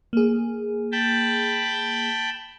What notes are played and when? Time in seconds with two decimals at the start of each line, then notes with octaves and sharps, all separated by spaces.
0.13 A#3 G#4
0.92 G5 A5 B5